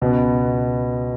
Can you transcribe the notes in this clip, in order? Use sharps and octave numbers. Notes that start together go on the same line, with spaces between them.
C#2 B2 B3